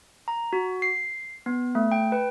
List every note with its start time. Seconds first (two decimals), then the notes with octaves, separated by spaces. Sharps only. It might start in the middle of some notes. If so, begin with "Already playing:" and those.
0.28 A#5
0.53 F#4
0.82 C7
1.46 B3
1.75 A3
1.92 G5
2.12 B4